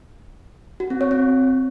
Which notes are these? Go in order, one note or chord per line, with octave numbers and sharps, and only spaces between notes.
F#4
C4
C#5
C4